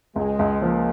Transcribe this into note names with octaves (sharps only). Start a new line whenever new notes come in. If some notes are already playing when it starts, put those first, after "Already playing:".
C#2 G#3
C#2
F3 A#3